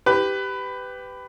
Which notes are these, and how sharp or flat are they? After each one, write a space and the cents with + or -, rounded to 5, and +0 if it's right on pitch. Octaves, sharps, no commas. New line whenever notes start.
G4 +0 B4 +20